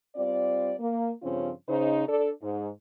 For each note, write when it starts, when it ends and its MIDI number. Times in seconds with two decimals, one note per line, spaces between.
0.15 0.73 55
0.15 0.73 60
0.15 0.73 65
0.15 0.73 74
0.79 1.11 58
1.22 1.50 43
1.22 1.50 49
1.22 1.50 53
1.22 1.50 60
1.22 1.50 61
1.22 1.50 65
1.68 2.03 49
1.68 2.03 63
1.68 2.03 72
2.08 2.29 62
2.08 2.29 69
2.08 2.29 74
2.42 2.68 44